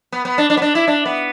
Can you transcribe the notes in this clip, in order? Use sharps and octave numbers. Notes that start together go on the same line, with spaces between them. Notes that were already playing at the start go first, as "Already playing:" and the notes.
B3
B3
D4
D4
B3
D4
E4
D4
B3